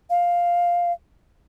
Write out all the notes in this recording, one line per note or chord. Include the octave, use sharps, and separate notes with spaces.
F5